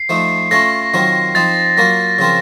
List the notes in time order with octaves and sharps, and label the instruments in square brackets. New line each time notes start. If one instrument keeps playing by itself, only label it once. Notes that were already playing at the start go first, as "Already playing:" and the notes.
Already playing: [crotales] C7
[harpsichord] F3 A3 D#4
[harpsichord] A3 C#4 F4 A4 [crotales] A#6
[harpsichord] D#3 F#3 C4 F4 A#4
[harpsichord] F3 C4 D#4 [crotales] A6
[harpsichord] F#3 A#3 F4 A#4 [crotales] A#6
[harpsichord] C#3 F3 C4 F4 A#4